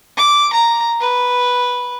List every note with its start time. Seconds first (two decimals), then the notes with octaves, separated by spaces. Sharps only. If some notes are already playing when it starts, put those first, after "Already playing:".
0.17 D6
0.53 A#5
1.01 B4